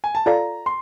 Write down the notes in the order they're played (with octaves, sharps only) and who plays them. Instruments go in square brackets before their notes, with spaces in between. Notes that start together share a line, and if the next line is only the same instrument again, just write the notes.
[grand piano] G#5
A5
[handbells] F4 A4 D5 F5 [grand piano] A#5
[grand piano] C6